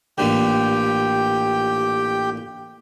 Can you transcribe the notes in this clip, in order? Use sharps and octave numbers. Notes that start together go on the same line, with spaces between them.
A1 A#2 D3 G4 G5